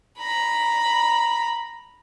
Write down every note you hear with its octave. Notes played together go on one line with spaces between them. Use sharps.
A#5 B5